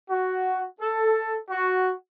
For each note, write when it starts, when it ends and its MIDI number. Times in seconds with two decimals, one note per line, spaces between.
0.10 0.63 66
0.81 1.36 69
1.51 1.92 66